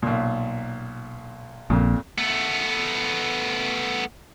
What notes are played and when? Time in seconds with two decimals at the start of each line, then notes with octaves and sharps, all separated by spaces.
0.02 B1 A#2
1.70 A#1 F2 A#2
2.18 A3 B3